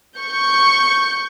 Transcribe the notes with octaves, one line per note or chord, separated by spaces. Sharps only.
C#6 G6